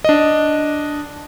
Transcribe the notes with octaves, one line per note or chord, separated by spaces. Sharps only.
D4 D#5